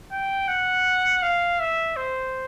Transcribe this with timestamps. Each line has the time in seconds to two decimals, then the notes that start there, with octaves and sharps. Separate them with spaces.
0.12 G5
0.48 F#5
1.22 F5
1.60 E5
1.96 C5